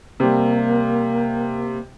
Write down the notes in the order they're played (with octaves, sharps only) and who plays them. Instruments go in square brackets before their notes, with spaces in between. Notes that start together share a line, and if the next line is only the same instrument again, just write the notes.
[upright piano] C3 G3 [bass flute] A#3